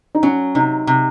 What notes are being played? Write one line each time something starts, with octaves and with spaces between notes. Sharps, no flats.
D#4
F#3 C#4
C3 D#4
C3